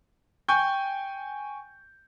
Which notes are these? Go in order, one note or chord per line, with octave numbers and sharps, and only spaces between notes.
G5 G#5 C#6 G6